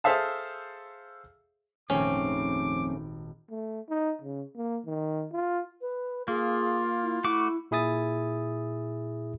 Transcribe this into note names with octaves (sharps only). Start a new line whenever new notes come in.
G#4 A4 C5 E5 F5 A5
D#1 G#1 F2 A#2 A3 C4 C#4 D6
A3
D#4
C#3
A#3
D#3
F4
B4
A#3 F4 G#4
E4
A3 E4 F#4 D6
A#2 E4 G#4 E5 D#6 A6